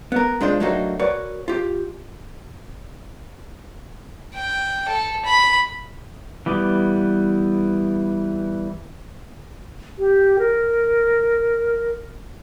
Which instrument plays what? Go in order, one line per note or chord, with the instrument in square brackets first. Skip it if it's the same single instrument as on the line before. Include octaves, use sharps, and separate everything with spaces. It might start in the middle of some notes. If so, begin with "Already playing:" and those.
[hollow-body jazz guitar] B3 A#4
G#3 D4 F4 C5
F#3 A3 A#3 D4 D#4 F#4
F#4 A#4 B4 C#5 D5
F4 G4
[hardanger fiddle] G5
A4
B5
[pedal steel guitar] E3 G3 B3 D6
[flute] G4
A#4